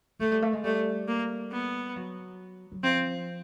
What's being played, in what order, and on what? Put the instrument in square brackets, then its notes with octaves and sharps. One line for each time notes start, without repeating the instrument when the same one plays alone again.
[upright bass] G#3 [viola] A3
[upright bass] G3
A3
G#3
[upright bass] G3 [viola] A3
[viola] A#3
B3
[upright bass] F#3
F#3
[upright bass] F3 [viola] C4